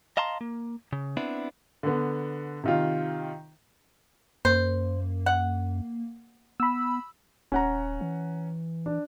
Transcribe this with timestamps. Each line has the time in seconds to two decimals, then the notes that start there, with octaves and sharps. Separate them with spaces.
0.17 D#5 F5 A5 A#5 C6
0.41 A#3
0.93 C#3
1.17 B3 C4 D4 E4
1.83 D3 B3
2.64 C3 D#3 F4
4.45 F#2 A#3 C5
5.26 F#5
6.60 B3 B5 E6
7.52 D#1 C#4 F#5 A#5
8.01 E3
8.86 D4